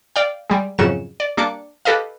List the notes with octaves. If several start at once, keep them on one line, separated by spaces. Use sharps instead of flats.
D5 F5 G5
G3 G#3
F2 G#2 C#3 F#3 C#7 E7
D5
G3 A#3 D4 D5 D6 C#7
G4 A4 B4 D#5 F5